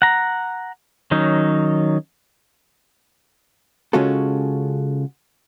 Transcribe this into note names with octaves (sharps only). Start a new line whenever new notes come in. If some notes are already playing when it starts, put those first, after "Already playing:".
F#5 A#5
D#3 F#3 C#4 D#4
C#3 G#3 C#4 F4 F#4 A4